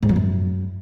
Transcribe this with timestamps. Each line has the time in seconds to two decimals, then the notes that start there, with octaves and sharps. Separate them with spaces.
0.03 G#2
0.09 F3
0.16 F#2